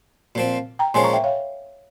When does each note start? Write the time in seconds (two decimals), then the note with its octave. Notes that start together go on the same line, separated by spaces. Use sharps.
0.35 A#2 F3 C4
0.79 G5 A#5
0.94 A#2 F3 G#3 C#4 G#5 C6
1.03 A#5 C#6
1.13 E5 G5
1.24 C#5 F5